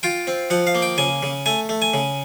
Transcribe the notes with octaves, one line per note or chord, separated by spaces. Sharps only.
F4 G5
C4
F3 F#5
F5
A#3
G5
C#3 G#5
C#3
A3 G#5
A3
G#5
C#3